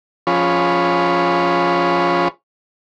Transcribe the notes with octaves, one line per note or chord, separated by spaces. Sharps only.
F3 C#4 F4 G#4 C#5 B5